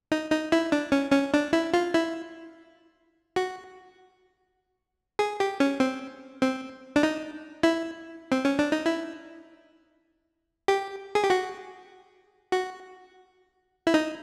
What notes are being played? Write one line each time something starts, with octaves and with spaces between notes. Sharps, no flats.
D#4
D#4
E4
D4
C#4
C#4
D4
E4
F4
E4
F#4
G#4
G4
C#4
C4
C4
D4
D#4
E4
C4
C#4
D4
D#4
E4
G4
G#4
G4
F#4
F#4
E4
D#4